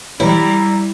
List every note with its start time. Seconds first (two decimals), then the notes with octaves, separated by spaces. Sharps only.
0.20 B2 E3 F#3 G3 E4 A#5